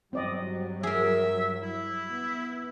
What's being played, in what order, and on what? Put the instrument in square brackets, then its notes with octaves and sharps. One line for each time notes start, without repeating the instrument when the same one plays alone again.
[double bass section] G2 F#3 G3 [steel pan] C4 D5 D#5
[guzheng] G#4 A#4 [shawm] E5
[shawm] E4
[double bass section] B3